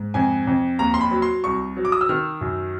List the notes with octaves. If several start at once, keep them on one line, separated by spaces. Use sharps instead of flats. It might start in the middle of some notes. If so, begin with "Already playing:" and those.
Already playing: G#2
F2 G#5
F2
D#2 A#5
C6
B5
F#3
C6
C2 C#6
F#3
D6
D#6
E6
D#3 F6
F#2